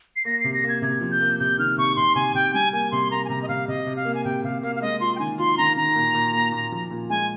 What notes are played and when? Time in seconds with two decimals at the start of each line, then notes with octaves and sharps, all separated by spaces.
0.16 C7
0.25 A#3 A#6
0.40 C3 C7
0.54 A#6
0.64 A#3 G#6
0.82 C3 G#6
1.01 F3
1.11 G6
1.20 A#3
1.39 C3 G6
1.58 D#3 F6
1.78 C3 C#6
1.96 C3 C6
2.15 C3 G#5
2.34 C3 G5
2.54 G3 G#5
2.73 A#3 G#5
2.91 C3 C6
3.11 A#3 A#5
3.25 G#5
3.29 C3 A#5
3.42 D#5
3.48 C3 F5
3.68 C3 D#5
3.87 C3
3.96 F5
4.05 A#3
4.15 G#5
4.24 C3 G5
4.44 C3 F5
4.62 A#3 F5
4.76 F5
4.82 G#3 D#5
5.00 F4 C6
5.16 G5
5.19 D#3 G#5
5.38 F4 C6
5.58 D#3 A#5
5.77 D#3 A#5
5.96 A#2
6.15 A#2
6.34 A#3
6.52 A#2
6.72 F3
6.91 A#2
7.10 G#3 G#5